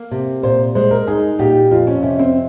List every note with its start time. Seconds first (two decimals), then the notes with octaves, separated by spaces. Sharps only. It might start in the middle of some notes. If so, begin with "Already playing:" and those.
Already playing: A#3
0.11 C3
0.43 A#2 C5
0.75 G#3 C5
0.91 A#4
1.07 D#4 G#4
1.39 A#2 G4
1.71 F2 F4
1.87 C#4
2.03 C3 C#4
2.19 C4